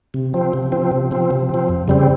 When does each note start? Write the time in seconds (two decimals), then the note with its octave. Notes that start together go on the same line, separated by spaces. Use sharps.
0.14 C3
0.34 F3 C4
0.53 C3
0.72 F3 C4
0.91 C3
1.11 F3 C4
1.30 C3
1.49 F3 C4
1.69 F2
1.88 C#3 G3 C4